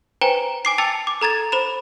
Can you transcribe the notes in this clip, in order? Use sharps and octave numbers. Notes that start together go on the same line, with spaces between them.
B4 C5 G5 G#5 A#5
G#5 D6 C7
G5 A5 E6 A6 C#7 F7
D6
A4 A#5 G#6 A6
C5 B5 E7